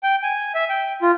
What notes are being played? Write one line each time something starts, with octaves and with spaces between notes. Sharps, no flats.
G5
G#5
E5
G5
F4